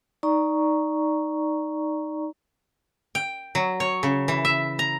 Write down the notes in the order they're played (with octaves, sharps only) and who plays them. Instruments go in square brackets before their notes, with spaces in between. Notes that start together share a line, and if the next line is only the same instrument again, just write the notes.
[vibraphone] D#4 D5 A#5 C#6
[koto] G5
F#3
C#5
C#3
E3
E5
A#5